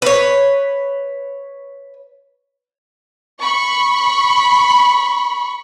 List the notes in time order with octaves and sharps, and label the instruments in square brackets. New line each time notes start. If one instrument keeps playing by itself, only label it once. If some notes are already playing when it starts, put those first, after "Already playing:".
[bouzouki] B4 C#5
[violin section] B5 C#6